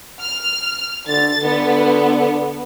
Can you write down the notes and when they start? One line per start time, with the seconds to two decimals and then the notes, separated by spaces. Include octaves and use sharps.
0.20 F6
1.08 D3 A6
1.44 D3 B3